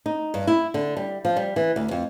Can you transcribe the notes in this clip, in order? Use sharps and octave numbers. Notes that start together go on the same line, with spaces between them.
D#4
G2
E4
D3
G3
F3
G3
E3
D2
F2